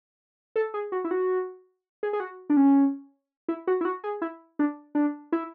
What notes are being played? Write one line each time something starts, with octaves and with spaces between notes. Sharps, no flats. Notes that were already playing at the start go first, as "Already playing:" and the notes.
A4
G#4
F#4
E4
F#4
G#4
G#4
F#4
D4
C#4
E4
F#4
E4
F#4
G#4
E4
D4
D4
E4